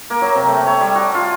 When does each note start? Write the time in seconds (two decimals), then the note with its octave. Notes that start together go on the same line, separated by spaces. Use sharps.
0.10 A#3
0.22 F#3
0.35 C3
0.48 A3
0.67 C#5
0.81 G3
0.96 F#4
1.15 F4